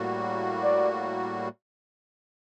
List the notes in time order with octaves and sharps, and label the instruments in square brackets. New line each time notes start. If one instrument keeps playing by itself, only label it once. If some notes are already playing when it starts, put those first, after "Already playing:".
Already playing: [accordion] A2 G3 A#3 F#4
[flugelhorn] D5